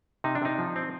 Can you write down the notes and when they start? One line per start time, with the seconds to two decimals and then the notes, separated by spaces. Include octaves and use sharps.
0.24 C3 D#4
0.35 D4
0.42 C3 D#4
0.58 F3
0.76 C4